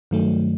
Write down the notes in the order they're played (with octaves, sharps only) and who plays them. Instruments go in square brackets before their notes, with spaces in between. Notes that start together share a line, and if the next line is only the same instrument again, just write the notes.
[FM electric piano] G2 D#3 F#3 A3